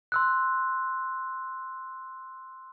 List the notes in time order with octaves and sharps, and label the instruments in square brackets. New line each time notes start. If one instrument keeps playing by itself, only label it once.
[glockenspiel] C6 E6 F#6